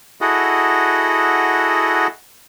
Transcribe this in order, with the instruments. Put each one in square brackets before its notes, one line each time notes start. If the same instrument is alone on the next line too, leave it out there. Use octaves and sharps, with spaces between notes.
[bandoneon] E4 F#4 G#4 A4 D#5 F#5